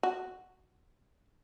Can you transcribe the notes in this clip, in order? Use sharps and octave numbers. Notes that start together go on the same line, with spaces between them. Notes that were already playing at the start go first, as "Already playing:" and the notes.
F#4